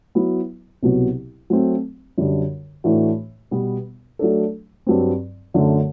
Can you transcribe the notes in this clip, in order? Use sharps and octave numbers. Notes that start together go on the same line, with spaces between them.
F#3 B3 E4
C2 B2 F#3
F#3 A3 C4
F#2 D3 G3 D4
A2 E3 A3 D4 F#4
B2 G3 B3
F#3 A3 D4 A4
G2 F#3 C4
F#2 D3 A3